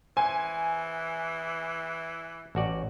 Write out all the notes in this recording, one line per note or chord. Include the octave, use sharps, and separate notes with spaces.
E3 C5 G#5
A1 F#4 D5